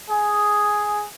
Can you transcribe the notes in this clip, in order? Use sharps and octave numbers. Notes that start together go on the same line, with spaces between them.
G#4